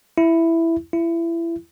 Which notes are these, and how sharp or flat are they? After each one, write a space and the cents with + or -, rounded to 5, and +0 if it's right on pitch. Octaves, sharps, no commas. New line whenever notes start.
E4 +5
E4 +25